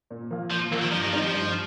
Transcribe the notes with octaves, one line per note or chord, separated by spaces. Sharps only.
A#2
F3 A#3 F4
A#2 F3
F3 A#3 F4
D#3
G2 F3
D#3
D#3 F3 G3 C4 D#4
F3
G2